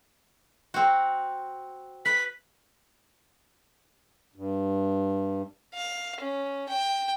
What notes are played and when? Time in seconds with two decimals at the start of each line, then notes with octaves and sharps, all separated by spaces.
0.74 C4 F#4
2.05 B4 B6
4.36 G2
5.74 F5
6.20 C#4
6.69 G5